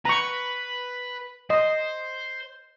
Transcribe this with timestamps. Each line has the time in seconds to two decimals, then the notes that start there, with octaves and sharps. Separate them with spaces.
0.05 B4 A#5 C#6
1.50 C5 D#5